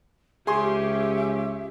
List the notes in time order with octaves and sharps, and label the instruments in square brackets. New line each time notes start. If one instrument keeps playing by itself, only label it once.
[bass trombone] C#2 [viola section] C#4 G4 [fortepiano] G#4 C6 [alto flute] E5